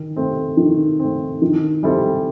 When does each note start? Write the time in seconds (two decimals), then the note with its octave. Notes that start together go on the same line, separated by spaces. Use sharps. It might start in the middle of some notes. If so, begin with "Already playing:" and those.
Already playing: D#3
0.16 A3 C4
0.57 D#3
0.99 C4
1.05 A3
1.42 D#3
1.83 G3 C4 E4 A4